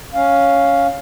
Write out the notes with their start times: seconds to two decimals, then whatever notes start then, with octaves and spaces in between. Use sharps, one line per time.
0.14 C#4 F5